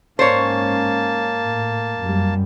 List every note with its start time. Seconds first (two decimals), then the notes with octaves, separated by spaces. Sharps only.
0.19 G#2 A#3 C#4 C5 C#5 A5
1.42 A2
2.00 F#2 G3